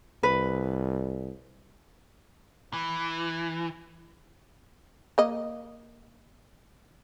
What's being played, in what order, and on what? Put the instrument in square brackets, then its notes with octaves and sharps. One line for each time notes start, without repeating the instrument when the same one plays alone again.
[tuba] C2 [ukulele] B4
[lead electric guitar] E3
[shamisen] A#3 D#5